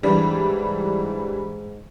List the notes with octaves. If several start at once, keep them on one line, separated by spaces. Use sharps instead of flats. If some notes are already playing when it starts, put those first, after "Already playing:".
G#2 E3 G3 D4